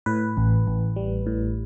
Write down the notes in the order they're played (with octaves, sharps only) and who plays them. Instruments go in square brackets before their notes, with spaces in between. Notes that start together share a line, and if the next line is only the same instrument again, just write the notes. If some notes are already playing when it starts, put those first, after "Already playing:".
[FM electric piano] A2 B4
A1
A1
G3
A2